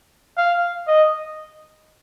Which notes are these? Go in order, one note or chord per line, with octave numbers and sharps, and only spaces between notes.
F5
D#5